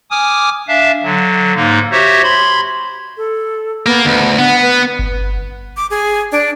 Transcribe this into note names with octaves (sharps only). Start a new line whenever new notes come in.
G#5 D6 D#6 F6
D4 E5 F5 A5
D3 F#3
G#2 A#3 D#4
F#4 G4 C5 C#5 E5
B5 C6 G#6
A4
A#3 B3
D2 B3
B3 F#5
B4
G1
D6
G#4
D4